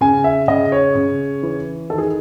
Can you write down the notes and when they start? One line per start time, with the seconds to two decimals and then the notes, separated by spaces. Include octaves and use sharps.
0.01 C#3 G#5
0.24 E5
0.48 C#3 D#5
0.72 C#5
0.95 C#3
1.43 E3
1.90 D#3 A4
1.98 G#4